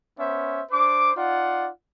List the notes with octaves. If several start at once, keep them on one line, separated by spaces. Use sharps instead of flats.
B3 C#4 C5 E5
D4 C5 D6
D#4 F4 D5 F#5